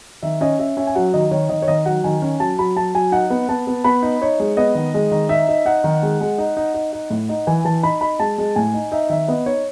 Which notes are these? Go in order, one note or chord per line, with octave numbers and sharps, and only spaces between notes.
D#3 E5
C#4 D#5
C#4 E5
C#4 E5
G#5
F#3 F#5
D#3 D#5
D#3 C#5
D#3 D#5
C#5
D#3 D#5
F#3 F#5
D#3 G#5
C#4
F#3 A5
F#3 B5
F#3 A5
F#3 G#5
D#4 F#5
B3
B3 A5
B3
B3 B5
D#4
D#4 C#5
G#3
B3 D#5
D#3
G#3
D#3
D#4 E5
D#4
D#4 F#5
D#3
G#3
G#3
D#4
D#4
D#4
D#4
A2
D#4
E3 G#5
E3 A5
D#4 B5
D#4 B5
G#3 A5
G#3
A2 G#5
D#4
D#4 E5
D#3 E5
B3 D#5
D#4 C#5